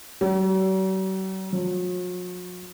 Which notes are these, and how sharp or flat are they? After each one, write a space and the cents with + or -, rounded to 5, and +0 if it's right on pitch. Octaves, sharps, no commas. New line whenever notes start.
F#3 +45
F#3 -45